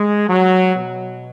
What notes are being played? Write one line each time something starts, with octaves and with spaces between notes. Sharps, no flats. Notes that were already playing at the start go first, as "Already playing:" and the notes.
Already playing: G#3
F#3
B2